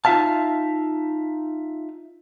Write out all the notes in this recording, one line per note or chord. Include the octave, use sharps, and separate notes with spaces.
D#4 F4 F#4 E5 F5 A5